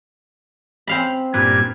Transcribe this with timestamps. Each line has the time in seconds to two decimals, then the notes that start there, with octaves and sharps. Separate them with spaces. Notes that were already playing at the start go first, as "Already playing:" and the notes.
0.87 C4 F5 B5
1.34 G2 A#2 B4 G#6